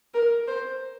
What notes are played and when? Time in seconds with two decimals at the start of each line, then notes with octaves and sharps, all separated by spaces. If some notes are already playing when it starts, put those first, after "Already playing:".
0.14 A#4
0.48 C5